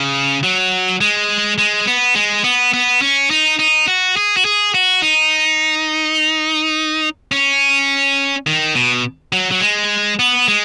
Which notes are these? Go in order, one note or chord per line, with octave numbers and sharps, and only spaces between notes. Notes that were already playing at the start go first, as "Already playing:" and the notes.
Already playing: C#3
F#3
G#3
G#3
B3
G#3
B3
B3
C#4
D#4
D#4
F#4
G#4
F#4
G#4
F#4
D#4
C#4
D#3
B2
F#3
F#3
G#3
B3
G#3